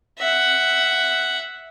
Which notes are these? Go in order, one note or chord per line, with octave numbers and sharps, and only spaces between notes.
E5 F#5